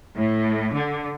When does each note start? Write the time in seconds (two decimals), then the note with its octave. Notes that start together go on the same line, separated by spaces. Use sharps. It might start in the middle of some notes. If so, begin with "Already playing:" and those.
0.17 A2
0.74 D3